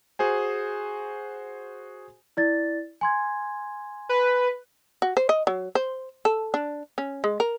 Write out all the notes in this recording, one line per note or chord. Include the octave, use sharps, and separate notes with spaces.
F#4 G#4 C5 G#5
E4 D5 A6
G#5 C6 G#6
B4
F#4
C5
D#5
F#3
C5
A4
D4
C#4
G#3
A#4